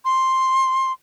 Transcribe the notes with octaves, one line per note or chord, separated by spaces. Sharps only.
C6